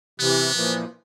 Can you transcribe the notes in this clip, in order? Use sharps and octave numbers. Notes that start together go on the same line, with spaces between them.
C3 E3 B3
A#2 E3 F3